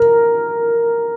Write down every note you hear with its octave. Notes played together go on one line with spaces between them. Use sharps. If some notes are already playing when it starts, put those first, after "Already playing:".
Already playing: A#4